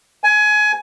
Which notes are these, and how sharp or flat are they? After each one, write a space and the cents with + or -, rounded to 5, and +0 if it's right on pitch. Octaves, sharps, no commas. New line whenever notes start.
G#5 +20